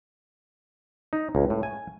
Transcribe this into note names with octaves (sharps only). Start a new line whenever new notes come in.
D#4
C#2
A2
G#5